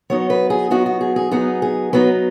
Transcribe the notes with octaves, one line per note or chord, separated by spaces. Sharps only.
F#3 B3 D#4 C#5
B4
G#4
F#3 B3 D#4 F#4
F#4
G#4
G#4
F#3 B3 D#4 G#4
G#4
F#3 B3 D#4 B4